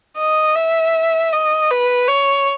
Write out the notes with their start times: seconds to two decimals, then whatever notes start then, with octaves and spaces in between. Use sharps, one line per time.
0.19 D#5
0.56 E5
1.33 D#5
1.71 B4
2.08 C#5